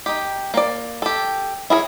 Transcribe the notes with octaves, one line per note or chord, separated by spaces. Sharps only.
D#4 G4
A#3 D5
G4 A4
E4 G#4 A#4 C#5